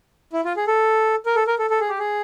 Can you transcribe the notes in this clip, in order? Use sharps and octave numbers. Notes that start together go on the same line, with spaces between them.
E4
F4
G#4
A4
A#4
A4
A#4
A4
A4
G#4
G4
G#4